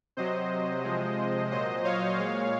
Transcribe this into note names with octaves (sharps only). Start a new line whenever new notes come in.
C3 F#3 C5 D#5
C3 F3 G#3
A#2 F#3 C5 D#5
C#5 F5
A#2 G#3